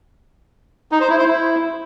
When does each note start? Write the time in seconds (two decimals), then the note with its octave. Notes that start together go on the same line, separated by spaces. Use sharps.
0.92 D#4
1.01 C5
1.10 E4
1.19 C5
1.28 E4